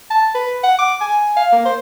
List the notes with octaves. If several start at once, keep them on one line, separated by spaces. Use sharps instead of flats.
A5
B4
F#5
D6
G#5
F5
A#3
C5